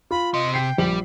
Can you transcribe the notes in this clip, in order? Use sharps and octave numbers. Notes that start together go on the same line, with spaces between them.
F4 B5
C3 D#5 C6
G5 B6 C7
A#1 G3 F#7